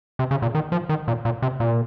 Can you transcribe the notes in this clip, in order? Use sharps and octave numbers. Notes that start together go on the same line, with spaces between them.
C3
C#3
A#2
D#3
F3
D#3
A#2
A#2
C3
A#2